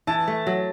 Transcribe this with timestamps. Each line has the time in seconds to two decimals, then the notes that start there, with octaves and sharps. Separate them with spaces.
0.07 E3 A5
0.28 A3
0.47 F#3